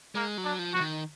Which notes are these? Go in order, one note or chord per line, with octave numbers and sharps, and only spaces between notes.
G#3 A#3
F#3
D4
F3
F3 F#4
D#3